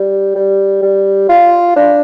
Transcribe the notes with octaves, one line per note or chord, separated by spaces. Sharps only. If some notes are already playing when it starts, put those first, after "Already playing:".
Already playing: G3
G3
G3
F4
D4